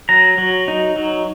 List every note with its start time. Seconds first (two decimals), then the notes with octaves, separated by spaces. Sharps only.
0.09 F#3 A#5
0.38 F#3
0.68 D#4
0.96 F#3